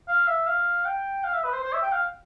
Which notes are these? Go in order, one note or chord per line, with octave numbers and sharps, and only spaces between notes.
F5
E5
F5
G5
F5
E5
B4
C5
C5
E5
G5
F5